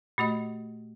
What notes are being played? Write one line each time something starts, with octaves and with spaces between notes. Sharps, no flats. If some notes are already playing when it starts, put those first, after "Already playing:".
A#2 A3 F#4 D#5